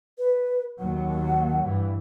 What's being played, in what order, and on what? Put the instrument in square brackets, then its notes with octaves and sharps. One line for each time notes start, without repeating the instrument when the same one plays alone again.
[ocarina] B4
[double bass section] D#2 F#3 [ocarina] F#5
[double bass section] G2 E3